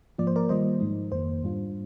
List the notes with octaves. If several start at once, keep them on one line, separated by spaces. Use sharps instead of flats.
G#2 F3 A#3 F4 D5
C5
A#4 D5
D#3 G3 A#3 F4 C5 D#5
G#2 F3 G#3 D#4
F2 D#3 A#3 C5
G#2 G3 D4 F4